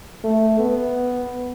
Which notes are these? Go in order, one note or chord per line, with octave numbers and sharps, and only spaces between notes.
A3
B3